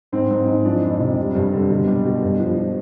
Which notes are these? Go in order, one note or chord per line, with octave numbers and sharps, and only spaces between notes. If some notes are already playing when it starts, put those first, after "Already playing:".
G#2 C4
G#2
G#2
F3 D4
F2
C3
G3
G2
D3
B2
G3
B2
G2
F3